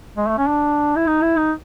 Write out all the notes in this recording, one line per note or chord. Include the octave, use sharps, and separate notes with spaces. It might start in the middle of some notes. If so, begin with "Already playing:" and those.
G#3
A3
C#4
D4
E4
D#4
E4
D#4